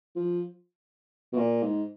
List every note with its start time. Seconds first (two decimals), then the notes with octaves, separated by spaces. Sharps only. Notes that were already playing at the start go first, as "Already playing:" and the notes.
0.16 F3
1.33 B2
1.38 A#2
1.63 G#2